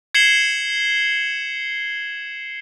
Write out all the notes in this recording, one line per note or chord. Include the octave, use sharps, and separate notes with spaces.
G#6 C7 C#7 E7 F#7 G7